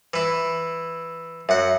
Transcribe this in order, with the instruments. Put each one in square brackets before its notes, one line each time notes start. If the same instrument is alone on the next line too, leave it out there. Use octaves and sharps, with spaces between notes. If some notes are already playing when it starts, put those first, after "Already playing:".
[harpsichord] E3 E4
[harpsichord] F#2 F#5 [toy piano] E5